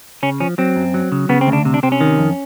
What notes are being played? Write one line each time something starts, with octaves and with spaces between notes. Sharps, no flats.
C#3 C#4
F3 C#4
F#3 C4
F#2
F#3
C#3
C#3 B3
C4
D2
D4
C3
D4
C3 C4
C#4
D#3
F2